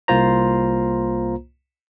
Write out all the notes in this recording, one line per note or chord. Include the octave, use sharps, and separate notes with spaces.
C2 A#3 F4 C5 A#5